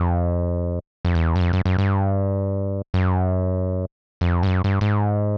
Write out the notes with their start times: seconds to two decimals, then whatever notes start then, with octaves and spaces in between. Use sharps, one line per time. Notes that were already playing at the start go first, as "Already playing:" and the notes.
Already playing: F2
1.05 F2
1.15 E2
1.36 F#2
1.41 F2
1.53 F#2
1.65 F#2
1.78 G2
2.94 F#2
4.21 F2
4.43 G2
4.47 F#2
4.64 G2
4.81 G#2